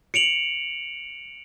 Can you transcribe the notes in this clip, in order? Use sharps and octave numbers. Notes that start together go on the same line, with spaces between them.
C#7 D7 F7 F#7